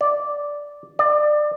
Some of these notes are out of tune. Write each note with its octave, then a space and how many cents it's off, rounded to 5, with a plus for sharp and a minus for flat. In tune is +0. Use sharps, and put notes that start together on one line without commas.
D5 -5
D5 +25